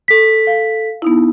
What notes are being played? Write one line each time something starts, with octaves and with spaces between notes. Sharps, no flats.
A4 B6
F5
B3 D#4 E4